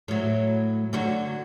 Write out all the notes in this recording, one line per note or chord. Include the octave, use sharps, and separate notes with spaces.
A2 F#3
D3 F#3 F#4